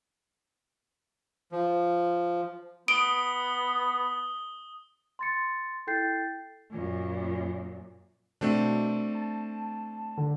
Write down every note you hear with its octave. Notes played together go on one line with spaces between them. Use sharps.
F3
B3 D#6 D7 G7
C6 A6 C#7
E4 A4 G5 G6 A6 C7
F#2 A#2
B2 A3 C4 D4
A5
D3